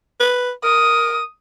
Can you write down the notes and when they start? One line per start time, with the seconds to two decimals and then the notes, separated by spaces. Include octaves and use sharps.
0.20 B4
0.64 A#4 D#6